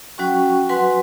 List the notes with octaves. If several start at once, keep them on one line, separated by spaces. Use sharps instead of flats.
F#3 C#4 F#4 G5 C#6
F#3 F#4 B4 F#5 G#5 C6